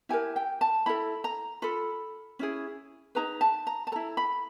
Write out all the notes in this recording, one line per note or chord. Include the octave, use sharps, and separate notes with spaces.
E4 G4 A#4 G#5
G5
A5
E4 A4 B5
A#5
F4 A4 B5
C#4 E4 G#4
D#4 G#4 B4 A#5
A5
A#5
A5
E4 A4 A#5
B5